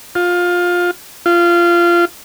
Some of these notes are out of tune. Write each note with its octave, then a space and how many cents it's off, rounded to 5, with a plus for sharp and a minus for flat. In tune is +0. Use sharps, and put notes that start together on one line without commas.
F4 +15
F4 -20